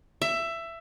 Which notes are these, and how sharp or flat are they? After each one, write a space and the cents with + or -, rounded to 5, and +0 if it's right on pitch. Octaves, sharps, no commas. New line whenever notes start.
E5 +15